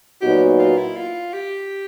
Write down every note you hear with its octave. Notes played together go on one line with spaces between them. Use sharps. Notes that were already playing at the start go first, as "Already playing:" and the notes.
A#2 F#3 B3 D#4 F#4 G4
F4
E4
F4
G4